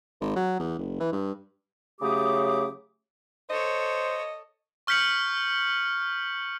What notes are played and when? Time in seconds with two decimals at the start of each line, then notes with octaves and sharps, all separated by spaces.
0.21 G#1
0.36 F#3
0.59 E2
0.79 F#1
1.00 E3
1.12 G2
2.01 C#3 F#3 A3 G4 D6 D#6
3.50 A4 C5 C#5 D#5
4.87 C#6 F6 G6 B6 C#7 F#7